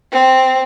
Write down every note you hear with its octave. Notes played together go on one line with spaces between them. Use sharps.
C4